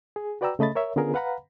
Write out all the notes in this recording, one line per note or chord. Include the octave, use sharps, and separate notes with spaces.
G#4
F#4 B4 D5 G5 A#5 E6
C#3 A3 D#5 B5 A6
A#4 C#5 E5
D3 B3 C#4 F4 G#4 A#4
B4 F5 F#5 A#5 B5